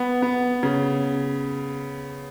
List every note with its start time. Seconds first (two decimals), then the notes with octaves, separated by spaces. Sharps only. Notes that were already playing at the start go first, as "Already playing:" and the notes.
Already playing: B3
0.22 B3
0.63 C#3